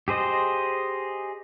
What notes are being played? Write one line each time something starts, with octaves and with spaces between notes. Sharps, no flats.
G4 G#4 C5 D#5